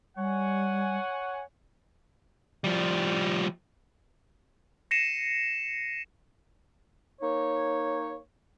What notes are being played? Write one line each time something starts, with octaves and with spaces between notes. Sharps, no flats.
G3 C#5 F#5 G#5
F3 G3
A#6 C7 C#7 D#7 E7
A#3 D#4 C#5